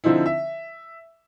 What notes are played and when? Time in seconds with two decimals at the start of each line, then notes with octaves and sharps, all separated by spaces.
0.04 D3 F3 C4 D#4 E4
0.26 E5